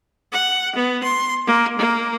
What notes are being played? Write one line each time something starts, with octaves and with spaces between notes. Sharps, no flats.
F#5
B3
C6
A#3
A#3